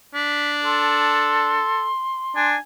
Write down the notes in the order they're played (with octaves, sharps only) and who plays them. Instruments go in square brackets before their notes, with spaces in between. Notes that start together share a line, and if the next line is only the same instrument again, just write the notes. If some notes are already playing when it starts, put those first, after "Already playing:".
[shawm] D4 [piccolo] B6
[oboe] A4 [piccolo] C6
[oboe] D4 [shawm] G#5